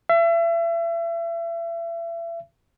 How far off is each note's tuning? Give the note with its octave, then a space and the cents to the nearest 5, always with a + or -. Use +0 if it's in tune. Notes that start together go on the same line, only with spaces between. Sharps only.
E5 +35